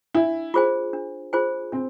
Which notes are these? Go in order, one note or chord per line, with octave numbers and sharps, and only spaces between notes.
D4 E4
F4 G#4 C5 G#5
D4
F4 G#4 C5 G#5
C4 D4